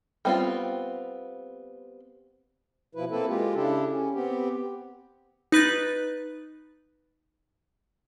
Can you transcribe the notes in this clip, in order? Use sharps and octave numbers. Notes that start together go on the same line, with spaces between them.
G3 B3 C4 D4 F4
B2 F3 E4 B4
A#3 C4 E4 A4 B4
G#3 F4 G4
C#3 D4 E4 G4 A4
C#4
B3 C4 G4
D#4 B4 F#6 A6